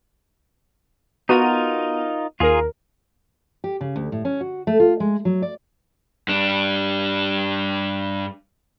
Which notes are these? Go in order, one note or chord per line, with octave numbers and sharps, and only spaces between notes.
B3 D#4 F4 F#4 A#4 D#7
D#2 F4 G#4 A#4
G4
C#3
D2
A2
C#4
F#4
A3
F4
G#3
F#3
D5
G2 D4